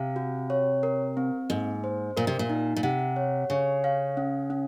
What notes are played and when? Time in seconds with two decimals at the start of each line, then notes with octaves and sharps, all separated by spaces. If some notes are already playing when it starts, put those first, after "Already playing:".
Already playing: C3 F5
0.16 F#4
0.50 C#5
0.83 A#4
1.17 C4
1.50 G#2 A#3
1.84 C5
2.17 A#2 A#4
2.27 C3
2.39 A#2
2.49 D#4
2.76 A#2
2.83 C3 F#5
3.16 C#5
3.50 C#3 C#5
3.84 F5
4.17 C#4
4.50 C#4